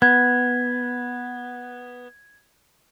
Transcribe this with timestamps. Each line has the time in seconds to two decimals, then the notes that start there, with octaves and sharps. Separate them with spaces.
0.02 B3 G#6